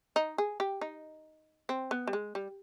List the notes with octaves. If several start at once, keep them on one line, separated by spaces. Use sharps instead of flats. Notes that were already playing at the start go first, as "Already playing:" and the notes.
D#4
G#4
G4
D#4
C4
B3
G3
G#3
G3